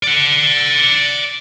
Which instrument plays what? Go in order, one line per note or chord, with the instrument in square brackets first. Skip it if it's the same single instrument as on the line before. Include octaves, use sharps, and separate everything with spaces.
[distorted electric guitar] D5 F#5